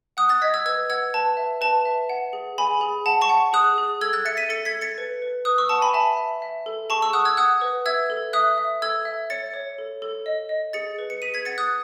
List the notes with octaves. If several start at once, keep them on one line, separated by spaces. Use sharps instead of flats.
F#5 D#6 F#6
F#6 A6
D#5 G#6 B6
E6 G#6
B4 E6 G#6
F#5 E6 G#6
B4 A5
E5
B4 A5
E5
F#5
G#4
G#4 G#5 B5
G#4
F#5 A5
A5 C#6
F#5
G#4 D#6 F#6
G#4
A4 E6 G#6
F#6 A6
E5 A6 C#7
B6 D#7
A4 A6 C#7
G#6 B6
A4
A6 C#7
B4
B4
B4 D#6 F#6
C#6 E6
F#5 A5 C#6
G#5 B5
E5 A5
E5
E5
A4
G#4 A5 C#6
C#6 E6
F#5 D#6 F#6
E6 G#6
F#5 D#6 F#6
B4
E5 E6 G#6
A4
E5 D#6 F#6
E5
A4 E6 G#6
E5
C#5 A6 C#7
C#5
A4
A4
D#5
D#5
G#4 A6 C#7
B4
C#7
G#4 B6 D#7
G#6 B6
F#5 A6 C#7
D#6 F#6